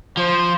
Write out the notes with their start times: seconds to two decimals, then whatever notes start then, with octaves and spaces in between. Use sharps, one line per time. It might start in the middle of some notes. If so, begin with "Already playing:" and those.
0.17 F3 C5